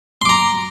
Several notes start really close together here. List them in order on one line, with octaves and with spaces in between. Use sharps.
C6 D6 A#5